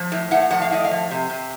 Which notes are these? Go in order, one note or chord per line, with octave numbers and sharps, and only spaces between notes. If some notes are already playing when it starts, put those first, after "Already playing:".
Already playing: F3
A2
A2 F#5
F3 F#5
F5
A2 D#5
F5
F3
C3
C3